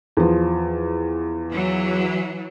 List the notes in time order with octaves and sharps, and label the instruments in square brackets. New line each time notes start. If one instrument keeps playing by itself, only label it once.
[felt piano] E2 F3
[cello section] E3 F#3